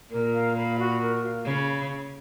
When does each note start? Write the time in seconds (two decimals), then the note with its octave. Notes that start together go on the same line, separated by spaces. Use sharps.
0.11 A#2 A#4
0.34 F5
0.56 B5
0.78 F#4
1.01 A#4
1.23 F5
1.45 C#3 B5